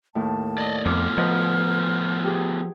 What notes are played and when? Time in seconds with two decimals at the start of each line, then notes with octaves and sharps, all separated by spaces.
0.15 D#2 A2 A5
0.58 D5 D#5
0.85 F2 A3 B3 F4 D6 F6
1.17 F3 B4 D#5 F#5
2.24 G4 G#4